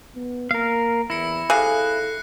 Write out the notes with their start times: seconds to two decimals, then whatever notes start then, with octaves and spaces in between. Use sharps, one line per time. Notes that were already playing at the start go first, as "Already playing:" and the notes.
0.16 B3
0.51 A#3 A#4 F5
1.10 E2 E4 A#6 C#7
1.50 C3 G#4 A4 F5 F#6 A#6 C7